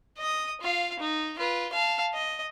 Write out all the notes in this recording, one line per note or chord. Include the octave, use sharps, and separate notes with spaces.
D#5 D#6
F4 F5
D#4
F4 B4
F5 A5
D#5